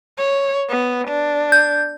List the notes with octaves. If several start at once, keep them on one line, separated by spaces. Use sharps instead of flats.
C#5
B3
D4
G6